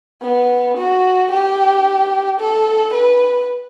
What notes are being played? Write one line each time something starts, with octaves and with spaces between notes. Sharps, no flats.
B3
F#4
G4
A4
B4